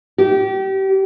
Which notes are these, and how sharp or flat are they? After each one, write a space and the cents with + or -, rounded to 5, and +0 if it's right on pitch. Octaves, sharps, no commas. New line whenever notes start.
G4 -30